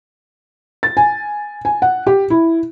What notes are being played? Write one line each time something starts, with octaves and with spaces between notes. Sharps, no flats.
A6
G#5
G#5
F#5
G4
E4